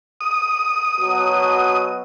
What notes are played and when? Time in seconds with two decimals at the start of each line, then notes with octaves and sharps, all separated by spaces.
0.21 D#6
1.00 B2 F#3